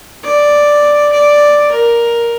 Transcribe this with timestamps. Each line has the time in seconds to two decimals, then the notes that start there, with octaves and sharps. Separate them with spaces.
0.24 D5
1.12 D5
1.71 A#4